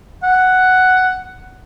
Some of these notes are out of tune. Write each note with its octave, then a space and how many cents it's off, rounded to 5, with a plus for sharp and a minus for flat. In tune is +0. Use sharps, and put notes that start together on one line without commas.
F#5 +5